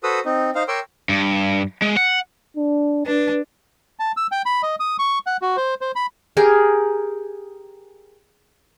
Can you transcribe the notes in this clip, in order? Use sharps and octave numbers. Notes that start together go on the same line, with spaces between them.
F#4 A4 B4 C5 D#6 E6
C4 D#4
D#4 C5 F5
A#4 C#5 G5 C6 D6 E6
G2
G#3
F#5
D4
D4 B4
A5
E6
G5
B5
D#5
D#6
C#6
F#5
F#4
C5
C5
B5
G4 G#4 A#4